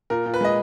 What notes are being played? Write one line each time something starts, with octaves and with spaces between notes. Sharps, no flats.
A#2 A#4
A#2
B4
G#3 D#5